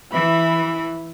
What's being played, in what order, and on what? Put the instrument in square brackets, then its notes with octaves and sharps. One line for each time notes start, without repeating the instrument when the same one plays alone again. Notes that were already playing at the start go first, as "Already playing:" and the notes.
[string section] E3 [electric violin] E5 B5